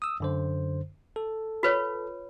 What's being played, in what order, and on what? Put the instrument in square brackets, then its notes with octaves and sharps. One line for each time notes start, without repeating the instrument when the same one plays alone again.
[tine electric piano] D#6 E6
F#2 D3 C5
A4
[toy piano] F4 B4 C#5